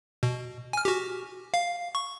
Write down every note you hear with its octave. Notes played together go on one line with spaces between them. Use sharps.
B2
G#5 F6
F#4 G4
F5
C#6